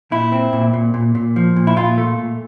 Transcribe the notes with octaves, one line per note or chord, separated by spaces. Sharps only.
A#2 E4
C4
A#2
A#2
A#2
A#2
F3
A#2
E4
A#2 F4
A3
A#2